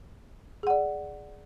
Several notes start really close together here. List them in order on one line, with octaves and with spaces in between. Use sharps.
G#4 F#5 D5